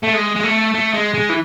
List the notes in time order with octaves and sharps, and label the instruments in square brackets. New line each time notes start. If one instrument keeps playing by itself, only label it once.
[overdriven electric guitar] A3
G#3
G#3
A3
A3
G#3
G#3
E3